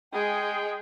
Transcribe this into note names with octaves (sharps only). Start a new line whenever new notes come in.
G#3 G#4 G5